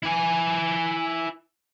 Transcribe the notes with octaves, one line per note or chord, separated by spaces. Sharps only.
E4 G#5